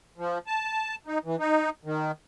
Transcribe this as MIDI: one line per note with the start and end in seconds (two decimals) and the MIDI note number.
0.18 0.38 53
0.47 0.95 81
1.06 1.18 63
1.25 1.36 52
1.39 1.70 63
1.85 2.11 51